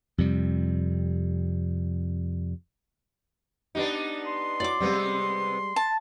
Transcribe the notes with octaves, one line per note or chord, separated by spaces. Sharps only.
F2 C3 G3
B3 D4 D#4 G4 D#5
C6
E4 F#4 C#5 D5 D6
C3 G3 G#3 B3 C4
A5